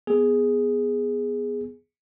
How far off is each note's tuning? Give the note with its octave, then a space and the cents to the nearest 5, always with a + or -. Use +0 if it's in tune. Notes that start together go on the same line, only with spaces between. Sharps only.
B3 +0 G#4 +0